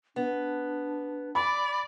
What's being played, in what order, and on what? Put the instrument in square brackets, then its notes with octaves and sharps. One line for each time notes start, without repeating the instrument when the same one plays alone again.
[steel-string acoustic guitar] B3 [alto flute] D4
[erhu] D5 [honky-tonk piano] B5